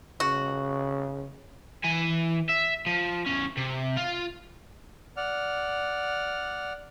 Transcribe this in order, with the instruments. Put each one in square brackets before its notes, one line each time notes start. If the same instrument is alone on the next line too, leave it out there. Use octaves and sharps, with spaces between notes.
[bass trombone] C#3 [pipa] F#4
[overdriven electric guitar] E3 G#5
E5
F3
E2 C#4
C3
F4
[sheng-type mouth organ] D5 F#5 F6